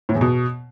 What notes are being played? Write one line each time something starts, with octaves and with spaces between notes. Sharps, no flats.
A2
E2
B2